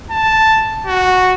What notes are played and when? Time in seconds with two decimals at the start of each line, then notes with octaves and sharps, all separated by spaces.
0.11 A5
0.87 F#4